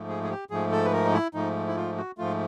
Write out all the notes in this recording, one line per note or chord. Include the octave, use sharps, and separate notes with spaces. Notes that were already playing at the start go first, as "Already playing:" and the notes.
Already playing: G#2 F3 A3
G#4
G#4
G4
G#2 F3 A3 G#4
A4
B4
A#4
D#4
E4
G#2 F3 A3 D#4
E4
F4
F#4
G#2 F3 A3 F4